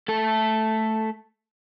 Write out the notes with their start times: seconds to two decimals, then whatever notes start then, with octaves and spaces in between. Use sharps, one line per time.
0.08 A3 A4